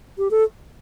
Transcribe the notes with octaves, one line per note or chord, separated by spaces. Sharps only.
G4
A4